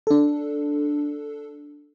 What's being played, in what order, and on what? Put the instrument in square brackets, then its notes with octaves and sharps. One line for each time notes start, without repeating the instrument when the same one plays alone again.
[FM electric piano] D4 A4